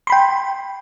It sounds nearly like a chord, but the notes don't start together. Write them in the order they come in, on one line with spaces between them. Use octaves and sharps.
C6 B5 G5